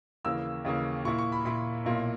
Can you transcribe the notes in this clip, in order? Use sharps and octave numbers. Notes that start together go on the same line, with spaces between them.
D#2 C#3 E3 A#3 E6
D#2 C#3 E3 A#3
A#2 A#3 E4 C#6
C#6
B5
A#2 A#3 E4 B5
B1 A#2 A#3 E4